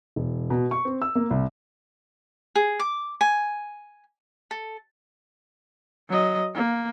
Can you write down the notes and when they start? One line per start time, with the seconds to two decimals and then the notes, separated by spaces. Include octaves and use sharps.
0.16 E1
0.50 B2
0.71 C#6
0.85 C4
1.02 E6
1.15 A#3
1.30 C2
2.56 G#4
2.80 D6
3.21 G#5
4.51 A4
6.09 F#3 D#5
6.54 A#3